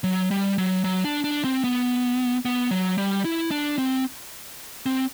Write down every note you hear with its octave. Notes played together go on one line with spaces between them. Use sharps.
F#3
G3
F#3
F#3
D4
D4
C4
B3
B3
F#3
G3
E4
D4
C4
C4